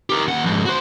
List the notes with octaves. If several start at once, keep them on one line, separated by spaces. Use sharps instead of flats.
G4 A#4
D#2 F#5
F2 G#2
F#4 C5